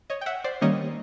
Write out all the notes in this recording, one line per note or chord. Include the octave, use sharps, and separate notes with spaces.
C#5 D#5
G5
E5 F#5
C5 D5
D#3 G3 A#3 C#4 C#5 D#5